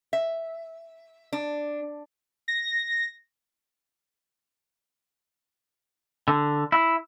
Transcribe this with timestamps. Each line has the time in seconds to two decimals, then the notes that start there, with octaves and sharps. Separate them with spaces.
0.13 E5
1.33 D4
2.48 A#6
6.28 D3
6.72 E4